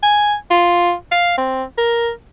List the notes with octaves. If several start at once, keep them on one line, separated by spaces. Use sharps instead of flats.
G#5
F4
F5
C4
A#4